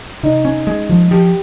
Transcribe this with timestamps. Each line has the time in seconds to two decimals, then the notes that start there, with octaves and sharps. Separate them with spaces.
0.23 C3 D#4
0.45 C#4
0.67 G#3
0.89 F3
1.11 F3 G4